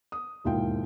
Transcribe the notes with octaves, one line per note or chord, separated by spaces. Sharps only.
D#6
E1 D#2 G#2 E4 F4 G5